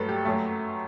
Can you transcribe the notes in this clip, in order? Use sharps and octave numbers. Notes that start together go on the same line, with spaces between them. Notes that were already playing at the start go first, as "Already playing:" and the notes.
Already playing: G2 F#3 A3 A4 B4
G4
F#2 F#3 A3